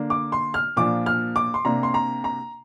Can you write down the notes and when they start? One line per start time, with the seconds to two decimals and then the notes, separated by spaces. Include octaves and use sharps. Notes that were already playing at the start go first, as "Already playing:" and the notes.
Already playing: D3 A#3 D4
0.10 D6
0.32 C6
0.54 F6
0.77 A#2 F3 A#3 D4 D6
1.06 F6
1.36 D6
1.54 C6
1.65 C3 A#3 D4 A#5
1.83 C6
1.94 A#5
2.24 A#5